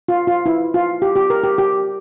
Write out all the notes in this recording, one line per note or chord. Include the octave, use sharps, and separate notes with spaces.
F4
F4
E4
F4
G4
G4
A#4
G4
G4